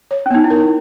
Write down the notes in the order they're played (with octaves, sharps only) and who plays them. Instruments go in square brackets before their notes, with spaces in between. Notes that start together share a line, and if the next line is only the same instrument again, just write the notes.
[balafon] C#5
[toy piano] C#4
[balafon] B3 [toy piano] D#4
[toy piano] E4
[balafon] A#4